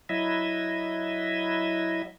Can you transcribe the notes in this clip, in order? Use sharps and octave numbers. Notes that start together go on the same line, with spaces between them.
F#3 E4 D#5 E5